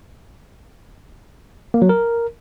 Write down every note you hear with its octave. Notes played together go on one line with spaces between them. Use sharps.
A#3
F#3
A#4